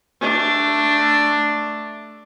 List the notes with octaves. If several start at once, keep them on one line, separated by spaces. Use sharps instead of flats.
A3 D4